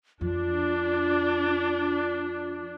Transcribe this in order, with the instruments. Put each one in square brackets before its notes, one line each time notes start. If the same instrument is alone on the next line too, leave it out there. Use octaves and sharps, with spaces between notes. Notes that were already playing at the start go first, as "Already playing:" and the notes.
[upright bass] F2 [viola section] D4 [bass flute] F4